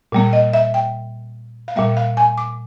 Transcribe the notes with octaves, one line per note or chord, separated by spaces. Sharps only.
A#2 G3 A#3
D#5
E5
G5
F5
A#2 G3 A#3 E5
F5
G#5
D6